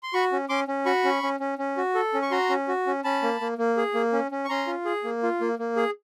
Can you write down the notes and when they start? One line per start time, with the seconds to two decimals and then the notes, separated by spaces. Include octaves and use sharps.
0.03 C6
0.13 F#4 B5 C#6
0.32 C#4
0.49 C#4 C6 D6
0.68 C#4
0.86 F#4 B5 C#6
1.04 C#4
1.23 C#4
1.40 C#4
1.58 C#4
1.77 F#4
1.95 A4
2.14 C#4
2.22 C#6
2.31 F#4 A#5 C6
2.49 C#4
2.68 F#4
2.87 C#4
3.04 C#4 A5 B5
3.23 A#3
3.41 A#3
3.58 A#3
3.77 G#4
3.94 A#3
4.13 C#4
4.31 C#4
4.45 C#6
4.49 C#4 A#5 C6
4.67 F4
4.85 G#4
5.04 A#3
5.23 F4
5.41 A#3
5.59 A#3
5.76 G#4